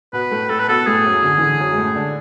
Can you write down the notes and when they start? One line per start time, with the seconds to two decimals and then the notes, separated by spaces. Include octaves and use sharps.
0.13 B2 B3 B4
0.31 A2 A3
0.49 A2 A3 A4
0.59 B4
0.68 B2 B3 A4
0.86 A2 A3 G#4
1.05 F#2 F#3
1.23 D3
1.38 E3
1.41 D3
1.60 F#2 F#3
1.72 G#3
1.78 A2 A3
1.96 D3 D4